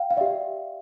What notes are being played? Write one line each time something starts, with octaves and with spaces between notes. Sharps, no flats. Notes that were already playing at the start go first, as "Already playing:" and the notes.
Already playing: F5 G5
F5
G4 D5 E5